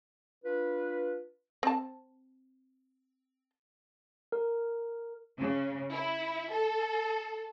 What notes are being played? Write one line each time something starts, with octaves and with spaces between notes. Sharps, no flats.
D4 F4 B4
C4 A5
A#4
C#3
E4
A4